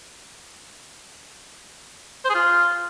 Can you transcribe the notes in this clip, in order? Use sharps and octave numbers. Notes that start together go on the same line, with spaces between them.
C5
G#4
F4